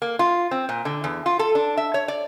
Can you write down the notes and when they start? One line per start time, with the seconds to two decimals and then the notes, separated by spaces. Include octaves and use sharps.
0.02 A#3
0.19 F4
0.51 C4
0.69 A#2
0.85 D3
1.04 E2
1.26 F4
1.39 A4
1.55 D4
1.77 E5
1.94 C#5
2.08 D5